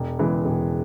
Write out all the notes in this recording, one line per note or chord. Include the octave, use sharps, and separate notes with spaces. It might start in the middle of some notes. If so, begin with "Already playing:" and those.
Already playing: E1
E2 C#3 E3 G#3
E1